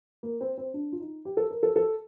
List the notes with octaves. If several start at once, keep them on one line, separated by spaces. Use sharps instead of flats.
A#3
C4
C4
D4
F4
D#4
G4
A4
A#4
A4
A4